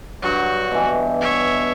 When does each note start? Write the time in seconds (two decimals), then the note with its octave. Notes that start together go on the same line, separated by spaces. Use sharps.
0.22 G2 F#3 F#4
0.71 B2 E3
1.21 C#5 E5